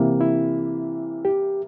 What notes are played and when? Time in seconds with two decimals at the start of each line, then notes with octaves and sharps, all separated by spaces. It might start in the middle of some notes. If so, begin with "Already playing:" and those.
Already playing: C3 E3 A#3
0.21 E4
1.25 G4